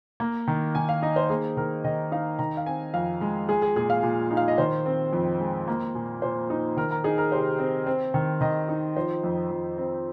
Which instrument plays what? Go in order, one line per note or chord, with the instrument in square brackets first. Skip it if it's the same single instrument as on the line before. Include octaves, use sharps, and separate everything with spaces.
[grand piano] A#3
D#3
D#3 G#5
F5
D#4 D#5
C5
A#3 G#4
D#3 A#4
D#3 D#5
D#4 F5
D#3 A#5
F5
C4 G#5
F2 F5
G#3
G#3 G#4
G#4
A#2 G#4
F5
A#2
D#4
F5
D#5
D#3 C5
C4
F2
G#3
A#3
A#2
A#2 C5
D#4
D#3 A#4
A#4
D#4 G#4
A#4
C3 C5
C4
C4
D#3
D#3 D#5
D#4
F3 C5
F2
F2
C4